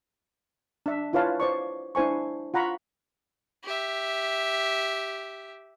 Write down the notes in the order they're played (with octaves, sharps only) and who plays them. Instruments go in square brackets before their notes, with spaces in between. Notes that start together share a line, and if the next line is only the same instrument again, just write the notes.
[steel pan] D4 E5
E4 F4 B4 C#5 F5 A5
C5 D5 C#6
D4 E4 C5 G#5 C#6
F4 F#5 A#5 B5 C#6
[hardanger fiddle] G4 E5